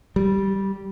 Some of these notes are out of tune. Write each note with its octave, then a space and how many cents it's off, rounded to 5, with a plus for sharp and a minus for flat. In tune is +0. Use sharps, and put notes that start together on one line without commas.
G3 -10